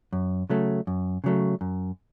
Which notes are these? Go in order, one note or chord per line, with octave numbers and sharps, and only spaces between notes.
F#2
C#3 F#3 A3
F#2
C#3 F#3 A3
F#2